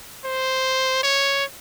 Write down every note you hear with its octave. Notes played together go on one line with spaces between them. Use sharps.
C5
C#5